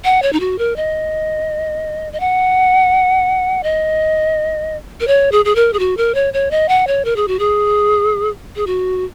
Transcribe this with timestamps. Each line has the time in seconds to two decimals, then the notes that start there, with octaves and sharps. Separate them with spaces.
0.05 F#5
0.22 C#5
0.33 D#4
0.40 F#4
0.59 A#4
0.76 D#5
2.13 D#5
2.20 F#5
3.63 D#5
5.00 A#4
5.07 C#5
5.32 G#4
5.45 G#4
5.55 A#4
5.73 G#4
5.79 F#4
5.97 A#4
6.15 C#5
6.34 C#5
6.51 D#5
6.69 F#5
6.87 C#5
7.05 A#4
7.16 G#4
7.28 F#4
7.39 G#4
8.56 G#4
8.67 F#4